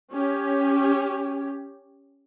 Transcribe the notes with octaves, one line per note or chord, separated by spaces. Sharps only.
C#4 G4